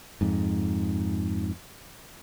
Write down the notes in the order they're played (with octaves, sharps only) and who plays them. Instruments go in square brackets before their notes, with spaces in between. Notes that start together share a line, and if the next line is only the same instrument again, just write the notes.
[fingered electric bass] F2 G#2